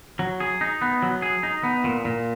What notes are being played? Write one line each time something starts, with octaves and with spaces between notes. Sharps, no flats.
F#3
G#4
D#4
B3
F#3
G#4
D#4
B3
A#2
A#2